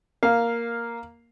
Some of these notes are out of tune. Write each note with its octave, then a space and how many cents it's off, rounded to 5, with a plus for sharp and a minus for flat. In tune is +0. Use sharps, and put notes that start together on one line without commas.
A#3 +0 F5 +0